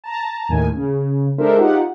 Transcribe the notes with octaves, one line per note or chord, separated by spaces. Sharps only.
A5 A#5
D#2 A2 D#3 G#5
C#3
G#3 D4 A4 A#4 C5 E5
D#4 F4 G4 F#5